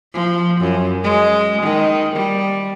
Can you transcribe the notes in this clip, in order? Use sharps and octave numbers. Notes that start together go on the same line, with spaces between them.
F3
F#2
G#3
D#3
G3